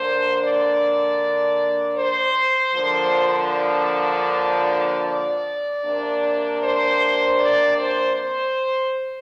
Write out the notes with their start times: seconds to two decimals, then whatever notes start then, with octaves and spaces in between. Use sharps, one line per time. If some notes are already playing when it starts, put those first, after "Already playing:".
Already playing: D3 A#3 D4 C5
0.42 D5
1.97 C5
2.75 D3 F3 A#3 D4
3.52 D5
5.07 D5
5.84 C3 A#3 D4
6.62 C5
7.39 D5
7.78 C5
8.17 C5